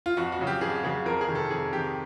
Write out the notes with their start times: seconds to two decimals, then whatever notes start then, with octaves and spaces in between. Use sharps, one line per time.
0.06 F4
0.17 F2 F#4
0.32 F#4
0.39 C#3 F#3
0.47 G4
0.61 F2 G#4
0.83 C#3 F#3 G#4
1.06 F2 A#4
1.21 G#4
1.28 C3 D#3
1.35 A4
1.50 F2 G#4
1.73 C3 D#3 G4